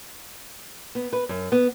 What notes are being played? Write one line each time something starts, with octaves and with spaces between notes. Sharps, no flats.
B3
B4
F#2
B3